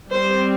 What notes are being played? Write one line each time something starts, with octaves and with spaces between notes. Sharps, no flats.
G3 C4 C5